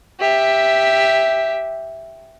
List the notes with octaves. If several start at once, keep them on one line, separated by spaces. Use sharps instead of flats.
G4 E5